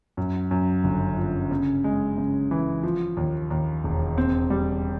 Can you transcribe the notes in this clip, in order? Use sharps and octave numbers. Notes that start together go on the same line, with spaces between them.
F#2
F#2
G1
F3
C#3
G#3
C#3
E3
F3
D#2
D#2
E1
C4
G3